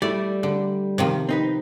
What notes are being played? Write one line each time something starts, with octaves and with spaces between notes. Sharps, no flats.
G3 A3 E4 D5
D3
C3 D#3 F3
C4 D#4 B4